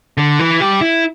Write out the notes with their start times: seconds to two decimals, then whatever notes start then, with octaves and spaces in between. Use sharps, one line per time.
0.17 D3
0.39 E3
0.60 G3
0.81 E4